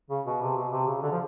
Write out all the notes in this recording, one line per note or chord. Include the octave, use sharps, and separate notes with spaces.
C#3
B2
C3
B2
C3
C#3
D3
F3